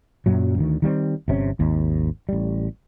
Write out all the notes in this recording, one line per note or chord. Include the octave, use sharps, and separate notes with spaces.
F#2 A#2 F#3
D2 D#3
D#3 G3 G#3 C4
G1 C3 C#4
G#1 D#2
A1 G3